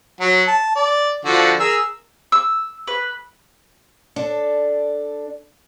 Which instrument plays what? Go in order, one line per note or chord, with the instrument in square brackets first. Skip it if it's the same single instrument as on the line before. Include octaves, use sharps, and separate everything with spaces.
[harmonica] F#3
A5
D5
D3 F3 F#4
G#4 A#4 E6
[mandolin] E6
B4
[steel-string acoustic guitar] D4 A4